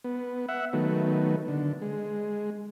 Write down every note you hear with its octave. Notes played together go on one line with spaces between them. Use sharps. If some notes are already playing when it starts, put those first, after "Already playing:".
B3
E5 F#5
D#3 F#3 A3 B3
D3
G#3